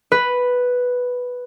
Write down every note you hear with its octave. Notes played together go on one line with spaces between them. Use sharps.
B4